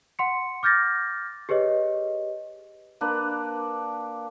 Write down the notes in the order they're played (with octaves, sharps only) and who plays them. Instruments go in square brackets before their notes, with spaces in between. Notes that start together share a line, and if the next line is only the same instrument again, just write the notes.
[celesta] F#5 C6 C#7
D6 F6 G6 A6 A#6
G4 G#4 B4 C#5 D#5
[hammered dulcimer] A#3 D4 B4